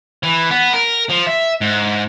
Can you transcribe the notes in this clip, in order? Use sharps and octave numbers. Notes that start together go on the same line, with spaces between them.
E3
B3
A#4
F3
E5
G#2